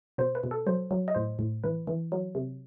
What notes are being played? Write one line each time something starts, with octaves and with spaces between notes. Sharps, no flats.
B2 C5
B4
B2
A4
F#3 C5
F#3
D#5
A2 C5
A2
E3 B4
E3
F#3
C3